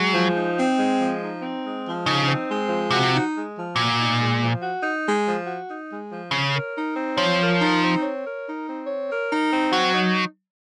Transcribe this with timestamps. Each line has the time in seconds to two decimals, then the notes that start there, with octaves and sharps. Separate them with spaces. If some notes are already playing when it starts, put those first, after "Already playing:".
Already playing: F#3 G#3
0.14 F3
0.35 D#4
0.57 C4
0.78 G#3
0.99 F3
1.21 D#4
1.42 C4
1.63 G#3
1.84 F3
2.06 C#3 D#4
2.27 C4
2.49 G#3
2.69 F3
2.90 C3 F#4
3.13 D#4
3.34 G#3
3.55 F3
3.76 A#2 F#4
3.98 D#4
4.19 G#3
4.40 F3
4.62 F#4
4.82 D#4
5.04 G#3
5.25 F3
5.46 F#4
5.68 D#4
5.89 G#3
6.11 F3
6.31 C#3 C#5
6.53 A#4
6.74 D#4
6.95 C4
7.17 F3 C#5
7.39 A#4
7.60 D#4
7.81 C4
8.02 C#5
8.24 A#4
8.45 D#4
8.66 C4
8.87 C#5
9.09 A#4
9.30 D#4
9.51 C4
9.72 F#3 F#4
9.93 D#4